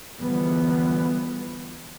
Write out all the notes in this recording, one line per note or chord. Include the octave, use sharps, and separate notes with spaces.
D3 E3 F3 G3 G#3 B3